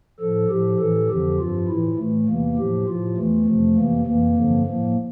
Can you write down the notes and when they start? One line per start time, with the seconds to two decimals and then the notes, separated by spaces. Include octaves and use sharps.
0.20 A2 F3 A4
0.50 A2 F3 G4
0.79 A2 E3 A4
1.09 F2 D3 F3 G4
1.39 G2 F3 F4
1.68 A2 E3 E4
1.98 A2 E3 A3
2.28 E2 C3 E3 A#3
2.58 A2 F3 G4
2.87 A2 F3 F4
3.17 E2 E3 A3
3.47 F2 C3 F3
3.76 F2 C3 E3 A#3
4.06 F2 E3 A#3
4.36 G2 D3 F3
4.66 A2 F3 A#3